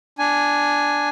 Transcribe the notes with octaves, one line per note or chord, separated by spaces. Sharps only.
D4 G#5